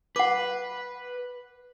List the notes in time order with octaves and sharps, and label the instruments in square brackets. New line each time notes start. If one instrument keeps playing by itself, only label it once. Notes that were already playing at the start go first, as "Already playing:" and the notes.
[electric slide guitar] B4 [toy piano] F#5 D6